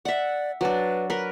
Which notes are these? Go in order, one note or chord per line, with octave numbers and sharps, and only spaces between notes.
D5 E5 F#5
F#3 D4 B4
A#4 B4